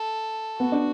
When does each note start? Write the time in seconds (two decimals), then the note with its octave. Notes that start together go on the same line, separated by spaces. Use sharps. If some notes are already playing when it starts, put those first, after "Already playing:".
Already playing: A4
0.60 B3 F#4
0.72 D4